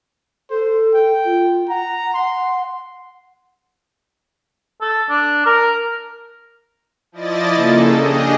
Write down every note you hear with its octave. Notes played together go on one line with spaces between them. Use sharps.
A4 C5
G5
F4
F#5 A#5
C6
A4
D4
A#4
F3 E4 D5 D#5 A6
C#3 A#3 A4
D4 G4 G#4 D#5